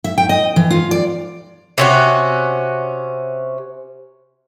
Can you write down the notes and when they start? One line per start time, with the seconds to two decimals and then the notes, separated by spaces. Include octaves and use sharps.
0.04 E5
0.18 G5
0.29 D#5
0.56 E3
0.71 F4
0.91 D5
1.78 C3 C#4 F#4